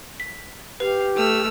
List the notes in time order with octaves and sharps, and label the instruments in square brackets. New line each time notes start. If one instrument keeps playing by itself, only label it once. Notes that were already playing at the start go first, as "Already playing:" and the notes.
[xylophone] B6
[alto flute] G4 [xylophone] B4 [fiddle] F5
[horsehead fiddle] A3 [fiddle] E6 F6